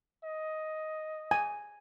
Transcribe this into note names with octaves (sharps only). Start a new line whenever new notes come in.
D#5
G#5